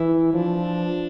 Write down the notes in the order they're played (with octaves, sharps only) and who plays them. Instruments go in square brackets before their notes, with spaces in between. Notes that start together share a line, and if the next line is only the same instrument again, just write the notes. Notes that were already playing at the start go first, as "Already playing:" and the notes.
Already playing: [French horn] E3 [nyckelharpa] E4
[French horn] F3 [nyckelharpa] D4